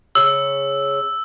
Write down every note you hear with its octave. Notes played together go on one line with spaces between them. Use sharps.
C#3 E6